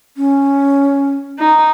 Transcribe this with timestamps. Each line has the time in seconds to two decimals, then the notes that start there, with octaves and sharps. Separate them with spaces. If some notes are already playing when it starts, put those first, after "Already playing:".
0.17 C#4
1.39 D#4